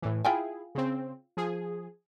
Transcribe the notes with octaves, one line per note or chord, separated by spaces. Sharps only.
A2 E3
E4 F4 G#4 G5 G#5
C#3 C4
F3 G#4